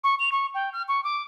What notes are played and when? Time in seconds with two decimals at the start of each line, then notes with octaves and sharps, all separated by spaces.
0.04 C#6
0.19 F7
0.32 C#6
0.54 G5
0.73 F6
0.88 C#6
1.04 D6